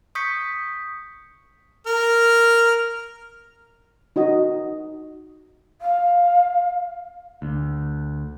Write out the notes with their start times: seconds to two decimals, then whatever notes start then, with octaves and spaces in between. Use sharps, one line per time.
0.15 C#6 D#6 G6 B6 C#7
1.87 A#4 F6
4.16 D#4 F#4 D#5
5.81 F5
7.42 D2